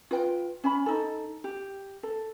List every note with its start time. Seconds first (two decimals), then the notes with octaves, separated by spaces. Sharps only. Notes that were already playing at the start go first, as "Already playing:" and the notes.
0.11 F4 B4 G5
0.64 C#4 G#5 B5
0.86 D#4 A4
1.44 G4
2.03 A4